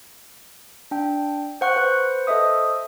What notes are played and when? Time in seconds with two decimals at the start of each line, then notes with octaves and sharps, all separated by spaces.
0.91 D4 G5
1.61 C5 F#5 C#6 F#6
1.76 B4 C5 F#5
2.27 A4 C5 D#5 E5 D#6